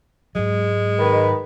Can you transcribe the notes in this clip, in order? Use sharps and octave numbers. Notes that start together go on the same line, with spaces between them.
G#2 F#3 G#3
D#3 B4